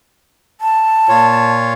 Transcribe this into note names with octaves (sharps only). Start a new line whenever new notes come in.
A5
A#2 F4 C#5